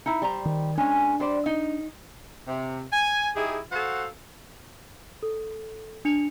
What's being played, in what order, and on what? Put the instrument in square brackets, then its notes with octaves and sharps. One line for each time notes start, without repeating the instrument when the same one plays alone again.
[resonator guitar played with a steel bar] D#4 E4
G3 C5 A#5
[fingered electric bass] D#3
[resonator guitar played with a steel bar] G#3 C#4 [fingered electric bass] D4
[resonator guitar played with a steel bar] G3 C5 D5
D#4
[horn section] C3
G#5
D#4 E4 G4 G#4
F#4 A4 C5 F5 F#5
[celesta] A4
D4 C#7 F7